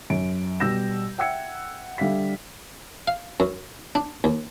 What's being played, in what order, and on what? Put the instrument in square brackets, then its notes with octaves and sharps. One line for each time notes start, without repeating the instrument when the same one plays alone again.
[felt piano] F#2 D7
B2 G3 E6 G6 A#6 E7
E5 F#5 G5 E6 G#6 C#7
D3 G3 E5 F5 B6
[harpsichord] F5
F#2
D4
D#2